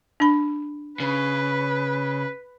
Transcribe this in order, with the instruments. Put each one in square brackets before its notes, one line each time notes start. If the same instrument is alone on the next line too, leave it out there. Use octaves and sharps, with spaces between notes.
[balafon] D4 B5
[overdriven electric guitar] C#3 [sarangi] B4